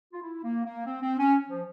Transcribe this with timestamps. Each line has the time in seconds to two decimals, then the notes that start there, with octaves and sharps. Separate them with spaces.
0.13 F4
0.22 E4
0.43 A#3
0.65 A#3
0.86 C4
1.02 C4
1.18 C#4
1.50 F3